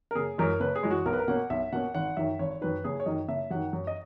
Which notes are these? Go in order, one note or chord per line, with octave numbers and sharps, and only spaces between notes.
A#4
F#1 G#4
F#2 E3 G#3 A#4
F#1 B4
G#4
F#2 E3 G#3
F#4
B1 A#4
B4
A#4
B2 A#3 C#4 F#5
B1 E5
B2 A#3 C#4 F#5
G#1 F#5
F#2 D#3 E5
G#1 C#5
F#2 D#3 B4
F#1 G#4
C#5
F#2 D#3 D#5
F#1 E5
F#2 D#3 F#5
F#2
D#5